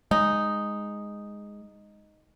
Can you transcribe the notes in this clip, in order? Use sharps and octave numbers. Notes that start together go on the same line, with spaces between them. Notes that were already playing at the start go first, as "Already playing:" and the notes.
G#3 D#4